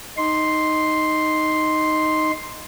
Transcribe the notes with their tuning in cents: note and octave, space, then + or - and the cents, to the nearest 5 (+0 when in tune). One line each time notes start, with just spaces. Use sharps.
D#4 +0 C6 +0